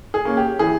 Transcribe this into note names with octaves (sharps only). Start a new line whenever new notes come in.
G#4
A#3 C#4
G4
E3 G#4